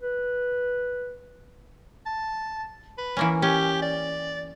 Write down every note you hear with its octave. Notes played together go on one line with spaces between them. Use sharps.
B4
A5
B4
E3 A#3 C#4
C#4 G4
D5